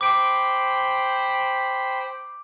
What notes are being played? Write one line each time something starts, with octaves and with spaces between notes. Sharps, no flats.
C5 G5 B5 D6 D7